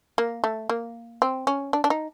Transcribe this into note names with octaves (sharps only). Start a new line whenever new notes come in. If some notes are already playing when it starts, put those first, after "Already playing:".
A#3
A3
A#3
C4
C#4
D4
D4
D#4